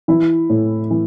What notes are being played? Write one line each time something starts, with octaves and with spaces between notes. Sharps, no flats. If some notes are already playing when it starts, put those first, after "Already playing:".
E3 E4
A2
E3